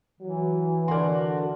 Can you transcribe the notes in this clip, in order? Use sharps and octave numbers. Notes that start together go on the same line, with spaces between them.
E3 F#3
D3 F#4 A#4 D5 C6